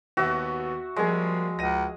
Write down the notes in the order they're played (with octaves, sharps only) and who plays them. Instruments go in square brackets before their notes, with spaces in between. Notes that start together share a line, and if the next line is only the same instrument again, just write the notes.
[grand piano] D#2 B3 [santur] F#4 E5
[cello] F3 [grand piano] G3 A#3 [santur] G#3 G#4
[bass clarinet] C#2 [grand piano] A#6 D#7